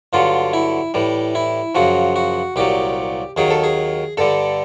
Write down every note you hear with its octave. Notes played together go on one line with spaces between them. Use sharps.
G2 D3 F#3 F4
E4
A2 E3 G3
E4
F#2 C#3 F3 F#4
F#4
C2 A#2 F#3 G4
D#2 D#3 F#3 G#4
A4
G#4
G2 D3 G3 A4